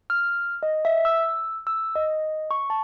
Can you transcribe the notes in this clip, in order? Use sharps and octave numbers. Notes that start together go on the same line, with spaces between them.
F6
D#5
E5
E6
E6
D#5
C#6
A5